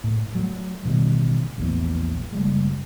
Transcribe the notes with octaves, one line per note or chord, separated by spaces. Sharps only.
A2
F#3 A3
A1 B2 D#3 G3
A#1 E2 A2
F#1 G3 G#3